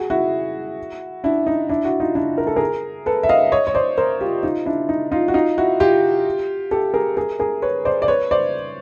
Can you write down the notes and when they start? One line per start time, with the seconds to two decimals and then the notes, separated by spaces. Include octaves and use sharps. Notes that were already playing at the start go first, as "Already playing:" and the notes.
Already playing: F#4 G#4
0.10 E4 F#4
1.24 D4 E4
1.47 D#4
1.69 D4 E4
1.85 E4 F#4
2.00 D#4 F4
2.15 D4 E4
2.38 A#4
2.47 A4
2.56 G#4 A#4
3.06 A4 B4
3.23 E5
3.29 D#5 F5
3.52 C#5 D#5
3.67 C#5
3.74 C5 D5
3.97 A#4 C5
4.21 F4 G4
4.43 D#4 F4
4.66 D4 E4
4.89 D#4
5.12 D#4 F4
5.28 F#4
5.34 D#4 F4
5.58 E4 F#4
5.80 F4 G4
6.71 G4 A4
6.94 G#4 A#4
7.17 G#4 A#4
7.39 G#4 A#4
7.62 B4 C#5
7.85 C5 D5
8.02 D5
8.08 B4 C#5
8.31 C5 D5